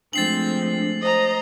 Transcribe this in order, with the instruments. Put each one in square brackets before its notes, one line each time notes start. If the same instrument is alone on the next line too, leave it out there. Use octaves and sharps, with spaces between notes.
[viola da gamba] F3 G#3 A3 [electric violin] C4 [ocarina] D4 [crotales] A6 C7 F#7
[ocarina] C5 [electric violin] D#5 A#5